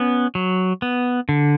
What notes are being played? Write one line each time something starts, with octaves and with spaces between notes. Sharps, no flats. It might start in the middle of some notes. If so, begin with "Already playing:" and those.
Already playing: B3 C#4
F#3
B3
D3